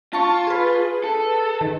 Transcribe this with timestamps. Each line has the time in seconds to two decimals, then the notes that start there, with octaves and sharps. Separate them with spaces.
0.13 F4 A5 C#6
0.47 G#4 B4
1.04 A4
1.61 D#3